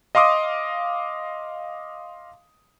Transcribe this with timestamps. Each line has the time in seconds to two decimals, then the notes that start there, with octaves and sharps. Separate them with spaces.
0.15 D#5 F5 C6 D6 D#6